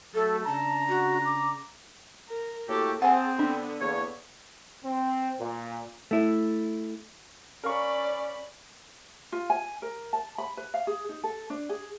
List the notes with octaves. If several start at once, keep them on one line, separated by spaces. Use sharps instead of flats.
F#3 A3 A4
C#3 D4 A5 A#5
F#4
D6
A#4
A2 A#3 F#4 G4 A4
C4 G#4 F#5 G#5 A5
D3 B3 D4
E2 A#3 C#5
C4
A#2
A3 E4
C#4 A#4 D5 F5 B5 C#6
F4
G#5
A#4
A5
B5
B4
F5
G#4
D#4
A4
D4
G#4